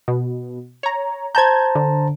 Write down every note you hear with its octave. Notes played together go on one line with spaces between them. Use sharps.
B2
C#5 A#5
C5 A5 A#5 G6 G#6
D3